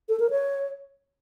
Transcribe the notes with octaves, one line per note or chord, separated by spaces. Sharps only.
A4
A#4
C#5